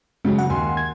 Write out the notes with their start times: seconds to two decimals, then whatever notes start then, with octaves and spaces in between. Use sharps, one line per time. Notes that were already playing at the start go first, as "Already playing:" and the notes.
0.25 C#3 F#3 G#3
0.39 F#5
0.50 D#2 G#5 C6
0.77 G#6